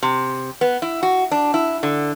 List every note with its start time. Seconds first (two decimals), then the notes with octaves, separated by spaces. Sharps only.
0.03 C3
0.61 B3
0.82 E4
1.03 F#4
1.31 D4
1.54 E4
1.83 D3